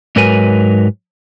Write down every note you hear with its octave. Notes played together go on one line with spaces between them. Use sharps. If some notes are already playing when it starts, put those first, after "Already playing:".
G#2 F#3 A#4 B4 G#5